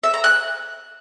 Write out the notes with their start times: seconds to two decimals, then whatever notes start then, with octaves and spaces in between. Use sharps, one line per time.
0.04 E5
0.14 A#5
0.24 F#6